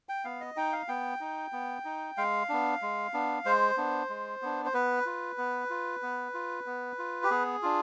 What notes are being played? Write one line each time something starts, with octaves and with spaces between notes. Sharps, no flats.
G5
B3 F5
D#5
D#4 G5
F5
B3 G5
D#4
B3
D#4
G#3 F5
B3 D4
G#3
B3 D4
G#3 C5
B3 D4
G#3
B3 D4
C5
B3 B4
F4
B3
F4
B3
F4
B3
F4
G4
B3 G#4
D4 F4